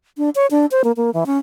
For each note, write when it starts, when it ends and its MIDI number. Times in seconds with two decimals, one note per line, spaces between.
0.18 0.30 62
0.35 0.47 73
0.51 0.66 62
0.71 0.82 72
0.84 0.92 58
0.97 1.10 58
1.14 1.24 52
1.26 1.38 61